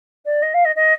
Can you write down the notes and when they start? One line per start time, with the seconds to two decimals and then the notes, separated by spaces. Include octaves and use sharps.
0.25 D5
0.42 D#5
0.54 F5
0.65 D#5
0.75 D#5